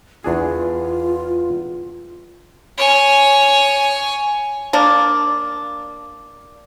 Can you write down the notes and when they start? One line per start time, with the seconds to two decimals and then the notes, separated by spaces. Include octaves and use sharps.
0.24 E2 D4 F4 G#4
2.78 C#5 G#5
4.73 A#3 D4